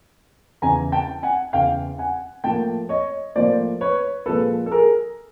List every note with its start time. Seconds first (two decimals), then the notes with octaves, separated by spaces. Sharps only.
0.62 E2 C#3 E3 G#5 A#5
0.92 G5 A5
1.23 F#5 G#5
1.53 E2 C#3 E3 F5 G5
1.98 F#5 G#5
2.44 A2 F3 A#3 G5 A5
2.89 C#5 D#5
3.36 A2 F3 A#3 C5 D5
3.81 B4 C#5
4.26 A#2 F3 G#3 A4 B4
4.66 A4
4.72 G#4 A#4